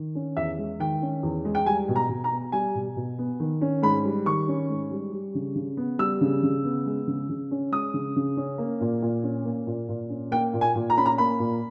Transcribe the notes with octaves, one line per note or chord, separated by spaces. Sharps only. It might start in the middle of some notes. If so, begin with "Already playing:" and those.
Already playing: D#3
C#4
E2 E5
G#3
D#3 G5
C#4
E2
G#3
G5
G3 G#5
B2
A#5
B2
A#5
B3
G3 G#5
B2
B2
B3
D#3
C#4
G#2 B5
G3
D#3 C#6
C#4
G#2
G3
G3
C#3
C#3
B3
G3 E6
C#3
C#3
B3
G#3
C#3
C#3
C#4
G#3 D#6
C#3
C#3
C#4
A#3
A#2
A#2
C#4
A#3
A#2
A#2
C#4
A#3 G5
A#2
G#5
A#2
A#5
C#4 B5
A#5
A#3 B5
A#2